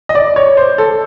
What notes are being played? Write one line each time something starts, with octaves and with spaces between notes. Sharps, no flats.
D#5
D5
C#5
C5
A4